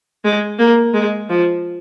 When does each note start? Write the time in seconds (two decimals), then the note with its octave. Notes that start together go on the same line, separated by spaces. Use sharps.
0.24 G#3
0.59 A#3
0.94 G#3
1.30 F3